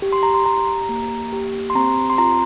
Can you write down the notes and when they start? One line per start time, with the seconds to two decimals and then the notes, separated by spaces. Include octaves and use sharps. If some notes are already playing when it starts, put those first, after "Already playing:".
0.02 G4
0.13 C6
0.23 A#5
0.34 C6
0.46 G4 A#5
0.89 A#3
1.33 G4
1.70 C6
1.75 C4 A#5
2.10 C6
2.18 F4 A#5